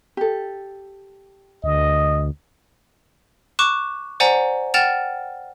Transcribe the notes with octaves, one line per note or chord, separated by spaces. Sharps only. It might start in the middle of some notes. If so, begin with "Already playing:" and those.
G4 A4
D2 D#5
C#6 D6 F#6 E7
C5 D5 F#5 G#5 A#5
F#5 G5 F6 A6 E7 F7